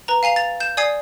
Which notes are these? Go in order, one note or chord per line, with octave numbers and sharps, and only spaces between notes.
B4 A#5
F5 G#5 C7 F7
A6 F7
G6 E7
D5 G#5 D#6 G#6 C7